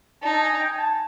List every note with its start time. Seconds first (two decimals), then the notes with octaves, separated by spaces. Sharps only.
0.22 D#4 A5
0.33 A5
0.41 G#5
0.60 G5
0.70 G#5
0.79 A5